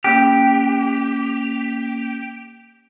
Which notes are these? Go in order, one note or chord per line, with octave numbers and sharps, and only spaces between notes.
A#3 C#4 G4 F#6